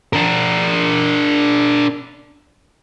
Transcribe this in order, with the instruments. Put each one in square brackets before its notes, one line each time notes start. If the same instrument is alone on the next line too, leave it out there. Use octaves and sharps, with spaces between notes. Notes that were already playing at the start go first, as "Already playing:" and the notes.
[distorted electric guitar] D4 A#4